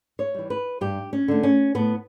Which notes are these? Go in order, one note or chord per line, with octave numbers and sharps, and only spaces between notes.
C#5
E3 G3
B4
G2 G4
C#4
D3 A3
C#4
A2 B3